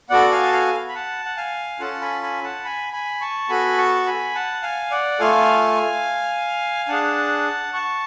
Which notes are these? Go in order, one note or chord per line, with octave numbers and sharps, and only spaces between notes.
B3 F#4 A4 D5 F#5
F5 G#5
A5
F5 G#5
B5
F#5 A5
F#5
F5 G#5
C#4 F4 A4 F#5 A5
G#5 B5
G#5 B5
F#5 A5
G#5 B5
G#5 B5
A5 C#6
B3 F#4 A4 G#5 B5
A5 C#6
G#5 B5
F#5 A5
F5 G#5
D5 F#5
A3 F4 A4 F5 G#5
G#5
D4 G#4 F#5 A5
A5 C#6